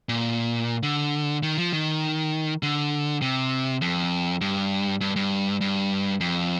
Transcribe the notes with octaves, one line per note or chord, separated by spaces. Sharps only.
A#2
D3
D#3
F3
D#3
D3
C3
F2
G2
G2
G2
G2
F2